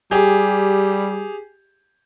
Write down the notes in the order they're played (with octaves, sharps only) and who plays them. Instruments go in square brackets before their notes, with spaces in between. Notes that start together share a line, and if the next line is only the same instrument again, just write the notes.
[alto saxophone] G3 [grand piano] G4 G#4